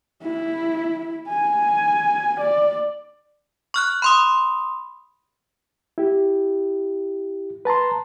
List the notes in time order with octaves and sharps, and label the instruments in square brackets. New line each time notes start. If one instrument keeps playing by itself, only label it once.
[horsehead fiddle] E4
G#5
D5
[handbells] C#6 F6 F#6
B5 C6 D#6
[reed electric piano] E4 G4
B4 A5 A#5 C6